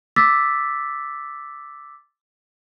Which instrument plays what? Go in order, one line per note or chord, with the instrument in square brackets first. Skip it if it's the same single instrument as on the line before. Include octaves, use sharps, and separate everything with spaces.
[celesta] D6 E6 A6 B6